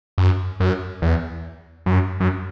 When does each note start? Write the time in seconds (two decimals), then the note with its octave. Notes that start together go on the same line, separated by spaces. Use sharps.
0.18 F#2
0.60 F#2
1.02 E2
1.86 F#2
2.20 F#2